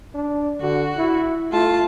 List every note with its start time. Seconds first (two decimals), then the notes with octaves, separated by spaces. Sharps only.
0.14 D4
0.61 D3 F#4
0.97 E4
1.52 A3 F4 A5